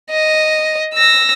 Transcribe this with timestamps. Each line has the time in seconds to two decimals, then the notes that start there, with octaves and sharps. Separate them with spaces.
0.11 D#5
0.94 E6 A#6